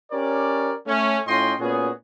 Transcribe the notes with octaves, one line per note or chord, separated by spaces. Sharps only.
C#4 G4 A#4 C#5 D5
A3 C#4
A2 C#4 F4 D#5 G5 C6
A#2 B3 C#4 F#4 G#4